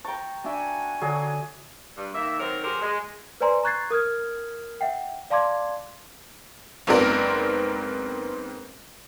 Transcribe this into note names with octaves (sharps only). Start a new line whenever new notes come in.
G5 A5 A#5 C#6
D4 F#4 E5 G5 G#5
D3 F#3 G#4
G2
D#3 A#3 E5
D#3 F#3 C4 A#4 C#5
F#3 G4 G#4 A#4 C5
G#3
B4 C5 D5 G#5 A#5 C6
A#5 C#6 F#6 G#6 A6 C7
A#4 D#6 F6 G#6
E5 F#5 G5
D5 F5 A5 C6 D6 G#6
F#1 G#2 B3 C4 A#4 D5